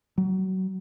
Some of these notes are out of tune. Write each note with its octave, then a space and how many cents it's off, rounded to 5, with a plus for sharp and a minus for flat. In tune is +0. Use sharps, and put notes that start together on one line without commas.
F#3 +25